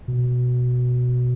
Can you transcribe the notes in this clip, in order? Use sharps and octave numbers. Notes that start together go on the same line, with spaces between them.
B2